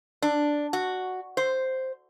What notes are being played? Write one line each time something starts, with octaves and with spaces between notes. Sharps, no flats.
D4
F#4
C5